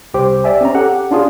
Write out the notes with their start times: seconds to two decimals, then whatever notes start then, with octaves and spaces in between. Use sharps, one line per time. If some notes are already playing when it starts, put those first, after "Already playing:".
0.14 C2 G4 C5
0.44 D5 E5 G#5
0.61 C4 C#4 A#5
0.75 G4 A4 F#5
0.93 F#5
1.11 C#4 D4 F4 G4 G#4